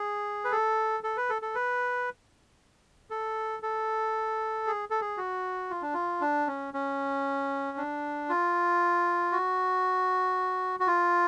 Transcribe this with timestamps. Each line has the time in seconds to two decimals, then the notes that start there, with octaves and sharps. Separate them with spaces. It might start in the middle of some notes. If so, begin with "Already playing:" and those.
Already playing: G#4
0.45 B4
0.52 A4
1.03 A4
1.17 B4
1.30 A4
1.42 A4
1.55 B4
3.10 A4
3.63 A4
4.67 G#4
4.90 A4
5.01 G#4
5.17 F#4
5.70 F4
5.82 D4
5.94 F4
6.21 D4
6.47 C#4
6.74 C#4
7.77 D4
8.29 F4
9.32 F#4
10.80 F#4
10.87 F4